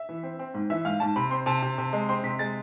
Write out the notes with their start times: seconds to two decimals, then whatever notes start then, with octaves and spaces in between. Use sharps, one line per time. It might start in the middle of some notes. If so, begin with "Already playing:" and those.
Already playing: E5
0.09 E3
0.23 C4
0.39 C4
0.54 G#2
0.70 E3 E5
0.85 G#2 F5
1.00 G#2 A5
1.16 C3 B5
1.31 C4 C6
1.46 C3 A5
1.62 C3
1.78 C3
1.93 G#3
2.09 C4 C6
2.24 C3 B6
2.39 G#3 A6